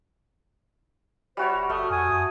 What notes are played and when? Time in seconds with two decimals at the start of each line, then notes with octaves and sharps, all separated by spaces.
1.37 G3 F#4 C5 C#5 E5 C#6
1.55 D1
1.70 G1 A3 F#4 D#6 F6
1.90 F2 G#5 D#6
2.08 F#2